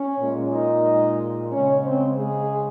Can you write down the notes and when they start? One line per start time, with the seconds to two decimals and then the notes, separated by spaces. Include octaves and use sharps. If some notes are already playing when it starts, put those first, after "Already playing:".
Already playing: C#4 C#5
0.20 A#2 G#3
0.53 D#4 D#5
1.52 C#3 G#3 C#4 C#5
1.85 C4 C5
2.18 G#3 G#4